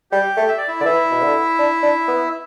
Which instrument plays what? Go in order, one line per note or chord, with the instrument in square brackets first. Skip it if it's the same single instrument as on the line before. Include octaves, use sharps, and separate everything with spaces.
[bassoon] G3 [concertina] G4 G5
[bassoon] A3
[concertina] E5
D5
E4 E5
[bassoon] D3 [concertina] D5
[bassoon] E3 [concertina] E4 E5
[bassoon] B2
D3
D4
D4
B3